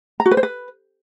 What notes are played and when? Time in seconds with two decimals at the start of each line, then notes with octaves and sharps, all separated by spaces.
0.20 A#5
0.26 F#4
0.31 B4
0.37 C5
0.43 B4